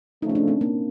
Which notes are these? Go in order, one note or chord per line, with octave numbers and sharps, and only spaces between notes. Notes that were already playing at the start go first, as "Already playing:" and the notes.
C#3 F3 A3 D#4
C#4
D4
C4
A#3